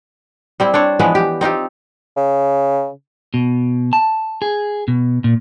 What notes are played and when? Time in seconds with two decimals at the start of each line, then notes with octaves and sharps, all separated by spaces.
0.60 G3 C4 E4
0.74 D4 C5 C#5
0.99 E3 F3 G#3 B3
1.15 G4
1.41 C4 D#4 F4 G4
2.17 C#3
3.34 B2
3.93 A5
4.42 G#4
4.88 B2
5.24 A#2